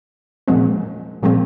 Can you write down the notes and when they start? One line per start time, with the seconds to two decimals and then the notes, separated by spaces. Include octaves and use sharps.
0.48 A#2 F3 G#3 C4
1.23 A#2 F3 G#3 C4